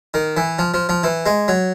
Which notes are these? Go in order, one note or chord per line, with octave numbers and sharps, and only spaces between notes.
D#3
E3
F3
F3
F3
E3
G#3
F#3